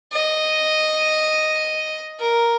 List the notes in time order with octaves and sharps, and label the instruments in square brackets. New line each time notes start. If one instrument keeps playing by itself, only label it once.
[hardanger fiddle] D#5
A#4